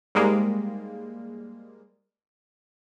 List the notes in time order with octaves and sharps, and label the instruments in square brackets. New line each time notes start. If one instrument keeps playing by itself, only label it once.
[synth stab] G#2 G3 G#3 A#3